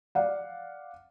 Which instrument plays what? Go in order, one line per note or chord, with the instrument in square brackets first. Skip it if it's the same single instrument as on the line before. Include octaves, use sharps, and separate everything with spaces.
[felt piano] D5 F5 F#5